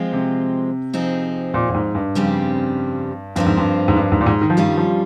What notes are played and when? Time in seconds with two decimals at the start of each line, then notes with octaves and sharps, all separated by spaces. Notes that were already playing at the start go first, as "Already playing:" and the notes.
Already playing: F3 G#3 C4 F4
0.13 C3
0.93 F3 C4 D#4 G#4
1.54 A#2
1.70 A#2
1.74 G#2
1.95 G2
2.15 F2 C#3 G3 C4 G4
3.36 G2 F3 C4 F4 A#4
3.46 G#2
3.57 G2
3.88 G#2
3.96 G2
4.12 G#2
4.21 A#2
4.26 G#2
4.41 D#3
4.50 F3
4.57 G2 D#3 G3 C#4 F4
4.77 F3